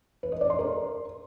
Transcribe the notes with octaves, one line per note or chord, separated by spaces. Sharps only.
B4
D#5
D5
C6
A#4